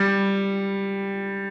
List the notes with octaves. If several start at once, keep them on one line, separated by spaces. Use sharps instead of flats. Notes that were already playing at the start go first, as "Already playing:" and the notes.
Already playing: G3